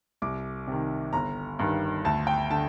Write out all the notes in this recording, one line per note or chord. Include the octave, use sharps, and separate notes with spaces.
C2 D6
C3 D#3
G1 A#5
G2 D#3
D2 A5
G5
D3 A5